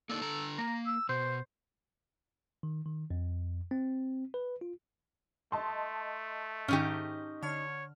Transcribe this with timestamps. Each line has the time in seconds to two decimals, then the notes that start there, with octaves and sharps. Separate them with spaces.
0.09 A#3 D4 D#4 A4
0.22 D3 A#5
0.58 A#3 A#5
0.86 E6
1.09 B2 C5
2.63 D#3
2.86 D#3
3.11 F2
3.71 C4
4.34 B4
4.61 F4
5.52 A3 D#5 A5 C6
6.68 G#2 D#3 C#4 D#4 G4
7.43 D3 C#5 F6